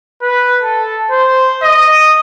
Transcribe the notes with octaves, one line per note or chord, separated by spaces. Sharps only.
B4
A4
C5
D#5